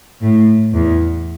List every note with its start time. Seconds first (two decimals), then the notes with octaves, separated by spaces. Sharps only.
0.22 A2
0.74 E2